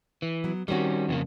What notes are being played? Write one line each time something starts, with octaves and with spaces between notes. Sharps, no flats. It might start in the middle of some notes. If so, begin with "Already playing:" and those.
E3
F#3 B3
D#3 G3 C4 C#4 F#4
F2 C#3 A#3